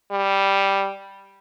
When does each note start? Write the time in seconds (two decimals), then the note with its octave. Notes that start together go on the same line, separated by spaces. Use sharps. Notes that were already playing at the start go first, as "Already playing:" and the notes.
0.11 G3